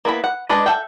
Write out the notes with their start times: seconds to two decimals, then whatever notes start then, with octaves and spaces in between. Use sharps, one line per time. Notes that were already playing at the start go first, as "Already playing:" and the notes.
0.05 A#3 B3 E4 B5
0.24 F#5
0.49 G#3 D4 B4 D#5
0.66 A4 E5 F#5 G5